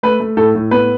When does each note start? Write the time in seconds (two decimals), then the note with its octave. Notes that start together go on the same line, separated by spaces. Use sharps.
0.03 A3 B4
0.20 A3
0.37 A2 A4
0.55 A2
0.71 B3 B4